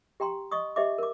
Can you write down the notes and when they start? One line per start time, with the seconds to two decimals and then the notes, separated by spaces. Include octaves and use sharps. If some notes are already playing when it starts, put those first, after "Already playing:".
0.20 G4 G5 A#5 C6
0.51 D#5 C#6 D#6
0.76 G4 C5 D#5 E5 D6
0.98 A#4 D6